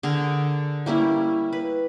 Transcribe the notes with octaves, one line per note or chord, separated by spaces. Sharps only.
D3 G#4 A#4
G3 A#3 C#4 E4
B4